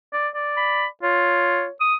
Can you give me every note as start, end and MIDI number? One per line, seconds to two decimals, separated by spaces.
0.13 0.28 74
0.35 0.86 74
0.57 0.87 83
1.03 1.66 65
1.03 1.71 73
1.81 1.95 87